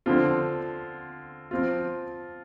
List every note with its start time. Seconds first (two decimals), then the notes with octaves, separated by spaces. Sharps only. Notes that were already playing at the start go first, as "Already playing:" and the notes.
0.06 D3 F3 C4 F4
1.51 F3 C4 F4